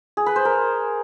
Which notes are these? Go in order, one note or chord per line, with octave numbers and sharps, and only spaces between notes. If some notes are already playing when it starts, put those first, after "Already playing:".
G#4
B4
C5
A#4